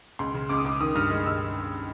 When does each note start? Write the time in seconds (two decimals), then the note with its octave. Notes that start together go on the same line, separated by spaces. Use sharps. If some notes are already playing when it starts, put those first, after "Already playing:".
0.19 C#2 C6
0.34 C#3
0.49 C#2 D6
0.58 D#6
0.64 C#2 D6
0.80 D#3 D#6
0.96 G2 F6
1.10 G#3 F6
1.25 G2 E6